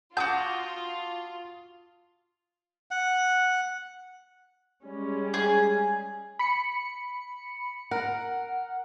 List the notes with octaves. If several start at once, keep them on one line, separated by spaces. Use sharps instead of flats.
F4 F#4 F#5 A5 D6 D#6 G6
F#5
G3 G#3 C#4
G#4
B5 C#7
A#4 F#5